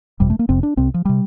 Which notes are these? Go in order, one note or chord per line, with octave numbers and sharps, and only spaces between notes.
G1 F2 C3 G3
A3
A#3
F1 F2 C3 C4
D4
C2 C3 C4
F3
C3 G3